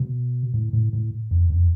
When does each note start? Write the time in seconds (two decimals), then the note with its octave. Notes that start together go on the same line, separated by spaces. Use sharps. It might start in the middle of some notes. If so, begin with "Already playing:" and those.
Already playing: B2
0.54 A2
0.73 A2
0.93 A2
1.31 F2
1.50 F2